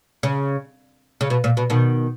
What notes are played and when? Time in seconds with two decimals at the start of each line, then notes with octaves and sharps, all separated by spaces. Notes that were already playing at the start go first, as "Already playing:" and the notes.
0.23 C#3
1.21 C#3
1.30 B2
1.44 A#2
1.57 B2
1.70 B2 D#3